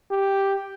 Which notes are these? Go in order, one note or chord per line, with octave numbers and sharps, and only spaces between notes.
G4